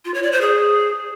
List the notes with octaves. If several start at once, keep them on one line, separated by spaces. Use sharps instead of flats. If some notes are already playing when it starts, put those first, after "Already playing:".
F4
C#5
D5
C5
G#4